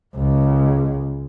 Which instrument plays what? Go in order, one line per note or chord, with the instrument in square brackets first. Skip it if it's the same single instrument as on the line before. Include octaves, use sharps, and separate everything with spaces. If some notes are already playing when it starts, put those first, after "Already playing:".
[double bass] C#2